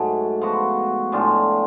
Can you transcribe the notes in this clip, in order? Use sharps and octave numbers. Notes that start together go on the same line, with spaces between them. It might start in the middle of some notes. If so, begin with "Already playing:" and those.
Already playing: G#2 F#3 A3
F3 B3 F#4
A2 G#3 D4 F4